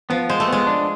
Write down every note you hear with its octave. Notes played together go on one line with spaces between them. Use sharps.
F3 B3
G#3 C5
A3
G#3 B3
D4